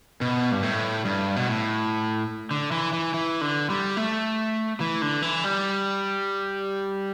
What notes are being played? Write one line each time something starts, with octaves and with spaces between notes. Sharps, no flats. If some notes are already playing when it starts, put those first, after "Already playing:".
B2
G2
A2
G2
B2
A2
D3
E3
E3
E3
D3
G3
A3
E3
D3
E3
G3